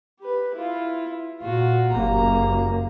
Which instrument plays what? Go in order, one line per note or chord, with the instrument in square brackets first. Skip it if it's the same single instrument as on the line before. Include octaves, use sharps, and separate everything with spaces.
[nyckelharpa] G4 B4
E4 F4
[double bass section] A#2 [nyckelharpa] F4 F#4
[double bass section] F#1 F#2 A#3 [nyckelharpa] G4 A#5